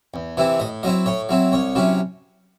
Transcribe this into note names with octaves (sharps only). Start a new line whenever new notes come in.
E2
C3 E3 C4 E4
A2 D#5
F#3 C4 E4 D#5
A2 C#5
F#3 C4 E4
C2 C#5
C3 F#3 C#4 E4